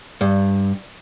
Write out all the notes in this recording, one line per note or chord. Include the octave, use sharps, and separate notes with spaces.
G2